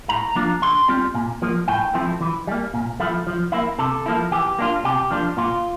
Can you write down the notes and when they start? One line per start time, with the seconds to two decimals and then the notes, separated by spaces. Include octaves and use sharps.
0.09 A2 A#5
0.35 F3 A#3 D4 F4
0.62 D3 C6
0.88 G3 C4 F4
1.15 A#2
1.42 F3 A#3
1.68 A2 G5
1.94 F3 A3 C4 E4
2.21 E3
2.47 G3 A#3
2.74 A#2
3.00 F3 A3 E4
3.27 F3
3.52 A#3 E4
3.78 C3 A4
4.06 F3 A#3 E4
4.31 E3 G4
4.59 A#3 D4 F4
4.85 C3 G4
5.11 F3 A#3 D4 F4
5.37 A#2 F4